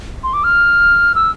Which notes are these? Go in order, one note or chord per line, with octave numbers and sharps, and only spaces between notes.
C6
D6
F6
E6